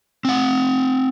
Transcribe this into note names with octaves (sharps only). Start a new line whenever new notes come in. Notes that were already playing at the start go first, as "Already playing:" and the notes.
C4 F#5